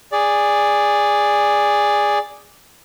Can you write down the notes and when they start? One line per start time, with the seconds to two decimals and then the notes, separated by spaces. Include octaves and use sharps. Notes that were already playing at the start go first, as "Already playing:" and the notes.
0.12 G#4 D5